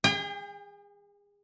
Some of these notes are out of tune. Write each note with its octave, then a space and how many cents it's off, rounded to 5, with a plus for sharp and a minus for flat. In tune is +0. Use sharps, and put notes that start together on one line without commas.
G#4 -30 G5 +35